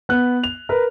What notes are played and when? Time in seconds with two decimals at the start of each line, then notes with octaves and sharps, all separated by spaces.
0.09 B3 F#6
0.43 F7
0.69 A#4 B4